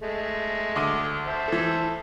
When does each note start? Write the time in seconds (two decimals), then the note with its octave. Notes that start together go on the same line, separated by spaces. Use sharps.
0.01 G#3 A3
0.76 D2 D6 D#7
1.27 C5 E5 A5
1.48 E3 A4